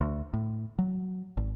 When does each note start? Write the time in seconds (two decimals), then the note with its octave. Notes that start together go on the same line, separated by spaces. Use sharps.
0.01 D2
0.33 A2
0.79 F#3
1.37 G#1